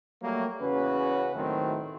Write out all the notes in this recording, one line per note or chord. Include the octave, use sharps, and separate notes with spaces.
F#3 G3 A3 A#3
E2 C#3 C#4 F#4 B4
D#2 A2 D#3 F#3 A3 C4